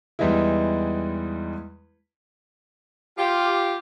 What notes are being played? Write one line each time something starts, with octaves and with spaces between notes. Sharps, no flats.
E2 G3 G#3 B3 D#4 E4
F4 G4